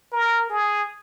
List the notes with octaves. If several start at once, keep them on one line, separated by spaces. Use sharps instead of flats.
A#4
G#4